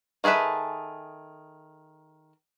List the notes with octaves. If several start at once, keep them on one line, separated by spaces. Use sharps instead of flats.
D#3 G#4 A4 B4 E5